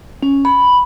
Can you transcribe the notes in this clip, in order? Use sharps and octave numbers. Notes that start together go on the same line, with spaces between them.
C#4
B5